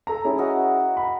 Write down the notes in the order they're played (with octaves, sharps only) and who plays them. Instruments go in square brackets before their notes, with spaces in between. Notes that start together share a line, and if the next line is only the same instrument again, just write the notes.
[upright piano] A4 A#5
C#4 E4 G#4
[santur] F#4 A#4 D#5
[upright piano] A#5 B5